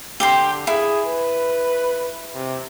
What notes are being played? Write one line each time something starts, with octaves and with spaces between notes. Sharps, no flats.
D3 G4 G5 C6
E4 G#4
B4
C3